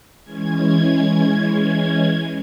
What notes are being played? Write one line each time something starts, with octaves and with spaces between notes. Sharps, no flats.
E3 G#3 C#4 G#6